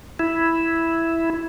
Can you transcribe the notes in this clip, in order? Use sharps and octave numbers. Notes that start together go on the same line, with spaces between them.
E4